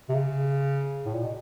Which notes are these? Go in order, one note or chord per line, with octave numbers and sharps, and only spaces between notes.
C3
C#3
A2
A#2
B2